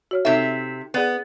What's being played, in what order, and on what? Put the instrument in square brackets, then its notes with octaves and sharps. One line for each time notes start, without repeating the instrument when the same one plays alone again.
[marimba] F#4 C#5 F6
[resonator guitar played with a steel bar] C3 E5 [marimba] D#4 A4
[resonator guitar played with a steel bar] B3 [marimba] G#4 D5 F#5